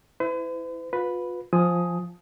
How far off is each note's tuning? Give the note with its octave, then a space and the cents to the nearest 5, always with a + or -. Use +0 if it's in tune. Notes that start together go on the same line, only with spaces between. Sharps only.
E4 +0 B4 +45
F4 +35 B4 +0
F3 +0 G#5 +0 D#6 +10